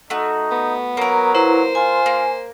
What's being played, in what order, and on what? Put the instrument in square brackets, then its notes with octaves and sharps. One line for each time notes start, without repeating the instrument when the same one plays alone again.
[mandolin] A3 F#4 [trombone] D#4
[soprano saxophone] B3
[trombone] F#3 [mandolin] A#3 A#4
[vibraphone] E4 B4 [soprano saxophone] C5
[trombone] F4 [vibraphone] G#5
[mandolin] A#3